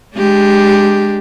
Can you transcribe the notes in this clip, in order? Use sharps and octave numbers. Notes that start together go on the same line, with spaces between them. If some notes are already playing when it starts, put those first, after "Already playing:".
G#3 D4 G4